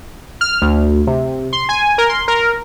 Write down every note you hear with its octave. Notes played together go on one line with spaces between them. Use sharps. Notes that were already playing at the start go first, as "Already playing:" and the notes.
F6
D2
C3
C6
G#5
A#4
C6
A#4